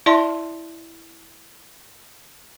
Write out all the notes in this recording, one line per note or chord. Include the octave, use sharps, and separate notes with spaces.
E4 D5 E5 A5 C6